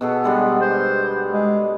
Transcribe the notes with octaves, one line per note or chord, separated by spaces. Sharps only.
B2 B3 G#4 A4
D3 G3 G#3
C5
G#3